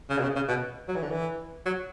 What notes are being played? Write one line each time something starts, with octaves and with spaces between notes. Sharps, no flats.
C#3
B2
C#3
C#3
B2
F#3
E3
D3
E3
F#3